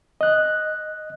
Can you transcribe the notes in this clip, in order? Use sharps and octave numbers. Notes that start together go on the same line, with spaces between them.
D#5 F#6